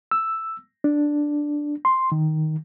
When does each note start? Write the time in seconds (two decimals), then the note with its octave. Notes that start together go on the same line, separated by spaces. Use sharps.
0.11 E6
0.84 D4
1.85 C6
2.12 D#3